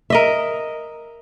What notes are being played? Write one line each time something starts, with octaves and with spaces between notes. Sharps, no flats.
A#4 D#5 E5